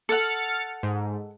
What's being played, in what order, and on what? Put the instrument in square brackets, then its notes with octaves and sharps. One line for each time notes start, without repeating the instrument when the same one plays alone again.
[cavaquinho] A4 F#5 [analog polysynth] F6 A6 C#7
[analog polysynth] G#2